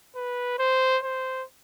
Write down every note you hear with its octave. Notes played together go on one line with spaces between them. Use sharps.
B4
C5
C5